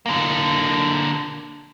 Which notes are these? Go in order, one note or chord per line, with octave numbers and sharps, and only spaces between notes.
D3 A#3